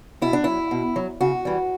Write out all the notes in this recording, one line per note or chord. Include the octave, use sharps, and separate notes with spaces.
B2 E4
D4
F#3 E4
B2
F#3
C#3 F#4
E3 G3